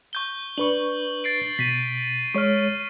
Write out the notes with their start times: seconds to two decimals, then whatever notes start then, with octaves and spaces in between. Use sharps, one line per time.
0.13 C#6 G6 G7
0.58 D4 B4 C#6 F#7
1.24 A6 C7 D7
1.59 B2 B6 D#7
2.34 G#3 C#5 C#6 F6